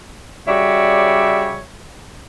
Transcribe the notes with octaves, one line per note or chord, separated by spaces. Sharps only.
C#3 G3 F#4 C#5 D5 E5